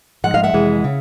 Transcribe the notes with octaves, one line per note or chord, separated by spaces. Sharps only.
G#2 F3 G#3 F#5
D#5 F5
E5 F#5
F2 C3 E3 G#3
C#3